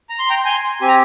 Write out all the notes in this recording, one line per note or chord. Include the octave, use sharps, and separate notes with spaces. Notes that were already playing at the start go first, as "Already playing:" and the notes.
A#5
C6
G5 A#5
G#5 C6
C4 G4 G#5
A#5